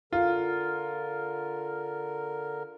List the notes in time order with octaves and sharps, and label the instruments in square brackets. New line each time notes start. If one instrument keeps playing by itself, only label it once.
[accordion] D3 A#4 [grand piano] F4